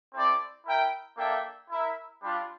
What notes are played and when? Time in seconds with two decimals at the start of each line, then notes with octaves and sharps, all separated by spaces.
0.14 C4 E4 A4 D5
0.65 E4 A#4 E5 G5
1.17 A#3 D4 A4 E5 G5
1.69 E4 A#4 E5
2.21 G3 D4 F4